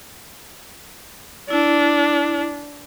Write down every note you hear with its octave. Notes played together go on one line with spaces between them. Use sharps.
D4 E4